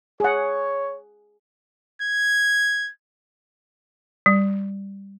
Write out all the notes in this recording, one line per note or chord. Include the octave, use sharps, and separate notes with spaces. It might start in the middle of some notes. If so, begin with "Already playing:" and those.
G#4 C#5 F#5
G#6
G3